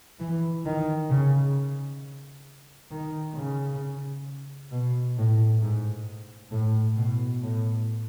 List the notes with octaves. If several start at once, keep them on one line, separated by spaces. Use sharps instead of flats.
E3
D#3
C#3
D#3
C#3
B2
A2
G#2
A2
B2
A2